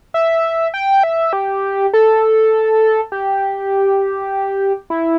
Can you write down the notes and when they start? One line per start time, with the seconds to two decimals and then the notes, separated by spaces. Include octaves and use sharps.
0.14 E5
0.74 G5
1.03 E5
1.33 G4
1.93 A4
3.12 G4
4.90 E4